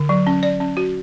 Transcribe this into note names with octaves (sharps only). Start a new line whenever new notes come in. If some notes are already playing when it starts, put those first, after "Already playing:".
Already playing: D3
F#3
C#4
D5
C#4
F#4